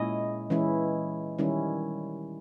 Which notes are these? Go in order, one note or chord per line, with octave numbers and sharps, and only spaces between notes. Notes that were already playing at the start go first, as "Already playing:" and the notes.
Already playing: A#2 G#3 C#4 E4 D#5
E3 G#3 C#4 E4
D#3 G3 C#4 E4